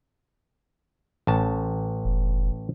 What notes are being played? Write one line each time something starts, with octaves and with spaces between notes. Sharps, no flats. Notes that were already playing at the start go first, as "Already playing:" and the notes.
A1 A5
F1